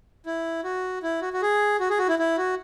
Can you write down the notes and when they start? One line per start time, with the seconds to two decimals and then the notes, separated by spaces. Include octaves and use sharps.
0.26 E4
0.64 F#4
1.03 E4
1.22 F#4
1.33 F#4
1.42 G#4
1.80 F#4
1.90 G#4
1.99 F#4
2.08 E4
2.19 E4
2.37 F#4